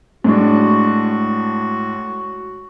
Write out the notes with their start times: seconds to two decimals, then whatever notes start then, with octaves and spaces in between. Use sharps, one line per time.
0.24 A2 G#3 D4 F#4